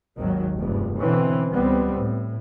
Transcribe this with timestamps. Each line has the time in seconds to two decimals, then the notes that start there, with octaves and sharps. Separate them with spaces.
0.18 G#1 D#2 D#3 F#3
0.57 F1 E2 G2
0.98 B2 D3 E3 C4 C#4
1.51 C#2 G3 B3 C4
1.95 A2